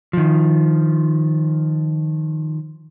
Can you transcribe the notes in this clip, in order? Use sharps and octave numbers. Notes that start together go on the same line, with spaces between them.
D#3 F3